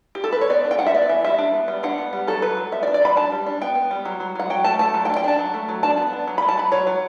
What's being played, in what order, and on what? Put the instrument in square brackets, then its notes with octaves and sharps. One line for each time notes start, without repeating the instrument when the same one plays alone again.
[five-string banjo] G4
A4
B4
C#5
B3 D5
D4
G5
D4 F#5
E5
B3 D5
E3 E5
G3 E5
D4
B3
G3
D4 F#5
B3
G3
F#3 A4
F#3 B4
F#3
B3 E5
D5
D4
D5
F#3 B5
D4 A5
G3
D4
B3 G5
B3
G3
F#3
F#3
F#3 F#5
F#3 G5
A3 A5
A3 A5
F#3 A5
G5
D4
G5
D4 A5
F#3
A3
F#3
D4 A5
B3
D4
F#3
F#3 B5
A5
F#3 B5
F#3 C#5
F#3